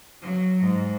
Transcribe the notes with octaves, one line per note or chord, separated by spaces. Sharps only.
F#3
G#2